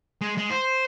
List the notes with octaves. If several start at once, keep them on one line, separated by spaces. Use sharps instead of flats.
G#3
G#3
C5